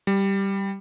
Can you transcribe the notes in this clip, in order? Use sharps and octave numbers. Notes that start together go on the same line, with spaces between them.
G3